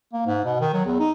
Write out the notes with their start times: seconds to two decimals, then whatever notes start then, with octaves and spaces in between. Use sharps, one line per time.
0.13 A#3
0.26 G#2
0.45 B2
0.60 D#3
0.73 F#3
0.86 E2
0.99 D#4